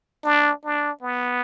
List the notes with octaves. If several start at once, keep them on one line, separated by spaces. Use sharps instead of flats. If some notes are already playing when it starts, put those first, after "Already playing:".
D4
D4
B3